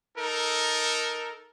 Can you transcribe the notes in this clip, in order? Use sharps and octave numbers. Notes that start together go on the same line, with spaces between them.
D#4 A4 A#4